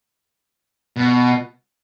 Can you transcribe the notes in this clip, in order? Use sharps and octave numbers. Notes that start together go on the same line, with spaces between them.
B2